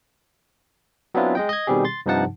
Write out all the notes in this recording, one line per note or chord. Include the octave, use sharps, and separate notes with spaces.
F#3 B3 C4 D4 E4 F4
G#3 D#5 G5
D#5 G#6
B2 D#3 G3 C4 G4 G#4
C6 A6
G2 C3 F3 D#4 F#5 A5